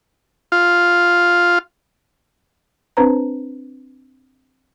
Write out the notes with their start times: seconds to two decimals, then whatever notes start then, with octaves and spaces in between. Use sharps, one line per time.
0.52 F4
2.97 C4 D4 B4 C5 A#5